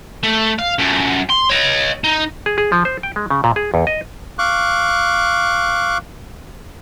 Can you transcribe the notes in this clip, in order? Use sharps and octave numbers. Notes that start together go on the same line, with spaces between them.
A3
F5
F#2 A3
C6
C#5 D#5
D#4
G#4
G#4
F3
C5
G5
G#3
C#3
A#2
G#4
E2
D#5
F5 C#6 D6 F#6